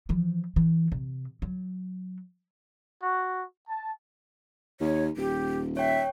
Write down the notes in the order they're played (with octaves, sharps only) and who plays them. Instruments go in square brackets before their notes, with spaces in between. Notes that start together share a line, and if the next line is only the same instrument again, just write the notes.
[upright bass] E3 F3
E3
C3
F#3
[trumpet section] F#4
A5
[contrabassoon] D#2 [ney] C#5
[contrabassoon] D#1 [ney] G4
[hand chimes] C#5 G5 [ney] E5